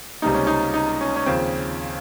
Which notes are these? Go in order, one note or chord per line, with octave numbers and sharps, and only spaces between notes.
C#2 C3 G3 A#3 D#4
C#4
D#4
D#4
C#4
C#4
D#2 C#3 F3 C4